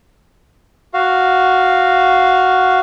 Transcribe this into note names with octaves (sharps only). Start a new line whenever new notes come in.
F#4 F5